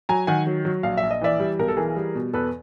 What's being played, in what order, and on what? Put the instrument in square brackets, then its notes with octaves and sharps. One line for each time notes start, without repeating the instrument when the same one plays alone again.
[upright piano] F#3 G#5 A#5
D#3 F#5 G#5
F#3
F#3
A#1 F5
E5
A#1
D#5
E3 D5 E5
G3
B1 A#4
A4
E3 G#4 A#4
G3
B2
E2 A4 B4